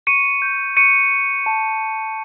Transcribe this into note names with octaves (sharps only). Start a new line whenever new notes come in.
C#6 C#7 D#7
G6
C#6 C#7 D#7
C#6
A5